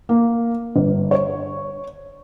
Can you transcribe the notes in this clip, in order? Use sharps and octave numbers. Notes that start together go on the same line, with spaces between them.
A#3
G1
C#5